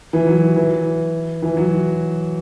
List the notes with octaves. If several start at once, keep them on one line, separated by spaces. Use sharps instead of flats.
E3
F#3
E3
E3
F#3